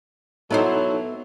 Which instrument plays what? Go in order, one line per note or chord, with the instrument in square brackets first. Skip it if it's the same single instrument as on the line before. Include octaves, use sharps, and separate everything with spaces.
[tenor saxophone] F#3 [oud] B3 E4 C5 [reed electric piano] D#4 A4